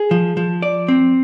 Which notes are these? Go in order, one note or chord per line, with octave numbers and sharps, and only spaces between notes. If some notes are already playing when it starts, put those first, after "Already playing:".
Already playing: G#4
F3
F3
D5
C4